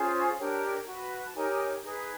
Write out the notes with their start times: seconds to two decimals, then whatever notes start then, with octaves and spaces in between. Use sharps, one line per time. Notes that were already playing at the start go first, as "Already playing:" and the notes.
Already playing: C#4 F4 G#4 C5
0.38 D4 G4 A#4 C#5 G5
0.86 F#4 B4
1.24 A5
1.34 D#4 G4 A#4 C#5 G#5
1.82 D#4 G#4 B4